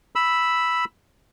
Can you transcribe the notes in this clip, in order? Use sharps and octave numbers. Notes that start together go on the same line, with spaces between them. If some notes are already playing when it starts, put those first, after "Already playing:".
B5 E6